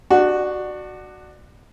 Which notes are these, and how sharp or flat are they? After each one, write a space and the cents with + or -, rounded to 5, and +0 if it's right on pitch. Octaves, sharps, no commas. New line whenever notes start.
D4 +25 F#4 +0